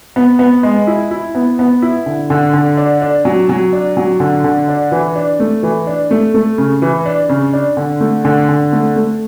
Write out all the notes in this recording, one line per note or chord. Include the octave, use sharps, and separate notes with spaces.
B3
B3
G#3
E4
E4
B3
B3
E4
D3
D3
D3
D4
D4
F#3
F#3
D4
F#3
D3
D3
D4
E3
D4
A3
E3
D4
A3
A3
C#3
E3
D4
C#3
D4
D3
A3
D3
D3
A3
A3